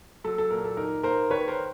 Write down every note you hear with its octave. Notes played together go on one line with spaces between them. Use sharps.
F#3 A4
A4
A#2 A#4
A4
D#4 A#4
A#3 A#4 C5
D#3 B4 C#5
A#4 C5